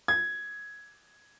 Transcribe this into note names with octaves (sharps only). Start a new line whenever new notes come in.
G#6